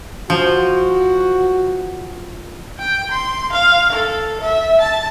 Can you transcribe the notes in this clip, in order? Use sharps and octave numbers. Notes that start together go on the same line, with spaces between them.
F3 F#4
G5
C6
F5
A4
E5
A5